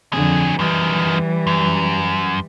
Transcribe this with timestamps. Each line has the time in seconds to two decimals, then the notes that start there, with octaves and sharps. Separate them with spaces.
0.13 F2 D3 F#3 G#4
0.59 F#2 D#3 E3 G3
1.47 F#2